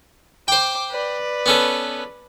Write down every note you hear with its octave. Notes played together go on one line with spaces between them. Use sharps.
C5 G5 D6
B4 D5
B3 C#4 A4